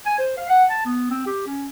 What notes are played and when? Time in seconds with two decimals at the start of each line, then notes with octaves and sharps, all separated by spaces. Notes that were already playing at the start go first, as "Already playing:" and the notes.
0.06 G#5
0.19 C5
0.37 F5
0.49 F#5
0.70 A5
0.86 B3
1.10 C4
1.26 G4
1.47 C#4